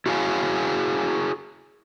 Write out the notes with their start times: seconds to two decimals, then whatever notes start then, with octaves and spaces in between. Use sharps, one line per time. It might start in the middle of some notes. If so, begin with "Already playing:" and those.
0.06 E4 F#4 G#4 C#5 F5 G#5